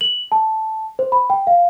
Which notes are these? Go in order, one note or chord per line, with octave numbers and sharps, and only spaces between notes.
F#7
A5
C5
B5
G5
F5